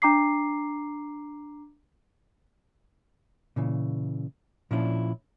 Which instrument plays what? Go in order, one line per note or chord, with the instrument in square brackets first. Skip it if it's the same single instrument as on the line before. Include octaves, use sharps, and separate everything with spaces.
[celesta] D4 A#5 D6 C7
[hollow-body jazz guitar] A#2 C#3 E3
A#2 F3 C#4 D4 E4